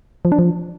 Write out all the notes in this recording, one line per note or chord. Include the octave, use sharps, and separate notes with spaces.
F3
D4
F3